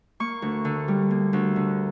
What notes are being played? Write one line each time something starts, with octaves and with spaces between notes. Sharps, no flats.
A#3 C#6
D2
D3
G3
A#3
D2
D3